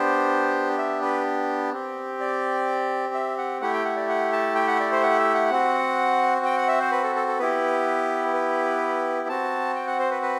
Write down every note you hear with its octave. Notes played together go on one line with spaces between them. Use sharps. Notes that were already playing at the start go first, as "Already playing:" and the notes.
Already playing: B3 D4 G4 C5
E5
B4
C4 G4
D5
E5
F#5
A3 E4 G4 F#5
G5
F#5
D5
F#5
A5
G5
F#5
D5
C5
F#5
E5
F#5
C4 F#4
G5
F#5
E5
C5
B4
A4
A4
A4
B3 E4 G4 B4
B4
C4 F#4 A5
G5
F#5
C5
B4
B4